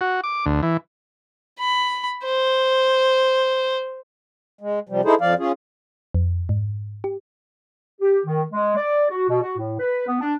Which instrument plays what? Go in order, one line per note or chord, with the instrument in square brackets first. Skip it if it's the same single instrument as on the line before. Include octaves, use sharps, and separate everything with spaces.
[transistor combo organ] F#4
D6
D2
E3
[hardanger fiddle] B5
C5
[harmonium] G#3
C3 F3 G3
D#4 E4 G#4 A4 C5
F2 F3 D5 F5
C#4 F4 G#4
[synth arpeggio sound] F2
G#2
G4
[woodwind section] G4
D#3
G#3
D5
F#4
B2
F#4
A2
B4
B3
D4